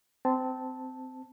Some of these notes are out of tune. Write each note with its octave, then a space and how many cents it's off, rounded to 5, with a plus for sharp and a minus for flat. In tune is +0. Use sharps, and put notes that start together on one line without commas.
C4 -20 A5 +0